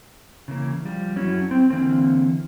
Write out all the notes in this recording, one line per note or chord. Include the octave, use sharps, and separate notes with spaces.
C#3 E3 A#3
F3 G3
F#3 C#4 E4 F#4
C4
D3 E3 A#3 C4